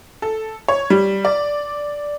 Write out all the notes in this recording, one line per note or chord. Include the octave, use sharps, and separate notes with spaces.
A4
C#5
G3
D5